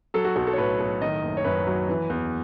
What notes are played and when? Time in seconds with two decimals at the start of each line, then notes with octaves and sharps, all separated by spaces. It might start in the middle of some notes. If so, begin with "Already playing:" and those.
0.14 F#3 A4
0.25 F#4
0.36 B1 F#4
0.47 A4
0.53 C#5
0.58 A2 B4
0.80 B1
1.02 D#3 D#5
1.23 F#1
1.37 C#5
1.44 F#2 B4
1.67 F#3
1.89 E3
2.10 E2